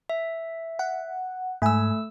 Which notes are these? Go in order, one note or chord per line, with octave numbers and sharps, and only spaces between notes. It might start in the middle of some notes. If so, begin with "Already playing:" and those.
E5
F#5
G#2 A3 G#5 E6